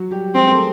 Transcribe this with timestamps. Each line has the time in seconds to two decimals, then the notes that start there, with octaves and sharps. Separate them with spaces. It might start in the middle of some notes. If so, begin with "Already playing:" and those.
Already playing: F#3 F#4
0.11 G3 G4
0.35 G#3 C4 G#4
0.46 A#4
0.51 A3 A4